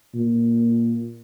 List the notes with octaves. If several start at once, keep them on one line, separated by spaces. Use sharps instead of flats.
A#2